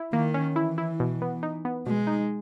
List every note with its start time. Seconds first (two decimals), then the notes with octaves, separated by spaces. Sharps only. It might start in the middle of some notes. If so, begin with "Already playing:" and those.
Already playing: E4
0.13 D#3 A#3
0.34 C#4
0.56 E3 E4
0.78 E4
1.00 B2
1.22 B3
1.43 D#4
1.65 B3
1.87 B2 G#3
2.07 D#4